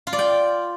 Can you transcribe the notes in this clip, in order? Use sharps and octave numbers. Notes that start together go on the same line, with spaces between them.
F4
D5
G5